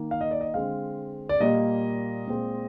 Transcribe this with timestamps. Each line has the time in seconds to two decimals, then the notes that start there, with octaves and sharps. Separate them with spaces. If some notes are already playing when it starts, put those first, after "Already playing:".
Already playing: D#3 A#3
0.11 F5
0.21 D#5
0.31 D5
0.41 D#5
0.54 D3 G#3 C4 F5
1.29 D5
1.40 A#2 G3 A#3 D#5
2.27 A#2 G#3 C4